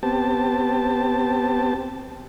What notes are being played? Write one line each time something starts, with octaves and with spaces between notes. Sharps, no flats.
B3 C4 G4 A5